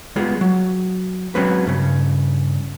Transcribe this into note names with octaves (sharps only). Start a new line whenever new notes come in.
G3 G#3 B3 F4 G#4
F#3
F#3 G#3 C4 C#4 B4
G2 C#3